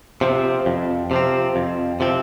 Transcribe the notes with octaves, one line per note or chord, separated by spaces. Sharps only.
C3 F3 C4
F2
C3 F3 C4
F2
C3 F3 C4